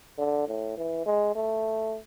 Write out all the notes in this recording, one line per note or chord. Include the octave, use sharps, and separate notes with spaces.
D3
A2
E3
G#3
A3